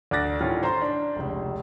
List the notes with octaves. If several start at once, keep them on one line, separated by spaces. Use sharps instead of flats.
D2 D4 D6 F#6 A6 A#6
A2 D#3 G3 C#4 F4
C5 A#5 C6
D4
F1 C#2